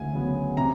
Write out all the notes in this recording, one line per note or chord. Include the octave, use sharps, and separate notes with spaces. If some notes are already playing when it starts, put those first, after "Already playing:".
Already playing: D2 C#3 G#5
C#3 F#3 B3
C3 A#5